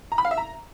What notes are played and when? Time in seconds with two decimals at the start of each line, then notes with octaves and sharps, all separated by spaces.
0.12 A#5
0.18 B5
0.25 F5
0.31 E5
0.37 A#5